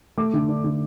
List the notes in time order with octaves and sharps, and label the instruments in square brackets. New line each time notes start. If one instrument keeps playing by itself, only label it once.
[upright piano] A3 D6
D3
D4
D3